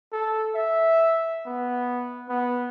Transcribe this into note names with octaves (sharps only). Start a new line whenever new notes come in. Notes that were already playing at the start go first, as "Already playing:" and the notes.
A4
E5
B3
B3